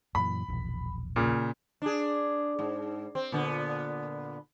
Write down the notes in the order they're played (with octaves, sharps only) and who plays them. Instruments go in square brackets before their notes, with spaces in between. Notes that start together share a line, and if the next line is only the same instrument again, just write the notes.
[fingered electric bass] F#2 A#2 E3 [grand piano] B5
[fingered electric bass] E1 A#1
[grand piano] A#2 C#3
[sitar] D4 G#4
G#2
C4
A#2 D3 B3